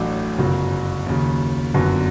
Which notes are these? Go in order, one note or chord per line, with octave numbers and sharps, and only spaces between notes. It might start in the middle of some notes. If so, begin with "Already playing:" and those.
Already playing: A1 A2 F#3 A3 D4
G1 F#2 C#3 F#3
D#2 C#3 F#3
G1 F#2 D3 F#3 B3